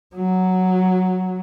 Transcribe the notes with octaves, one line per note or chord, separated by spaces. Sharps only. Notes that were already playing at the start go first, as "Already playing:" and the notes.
F#3